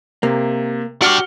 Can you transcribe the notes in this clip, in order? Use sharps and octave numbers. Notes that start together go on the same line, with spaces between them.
C3 A#3
D4 F#4 G4 C#6 F6 C#7